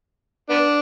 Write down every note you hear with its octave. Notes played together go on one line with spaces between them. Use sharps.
B3 D4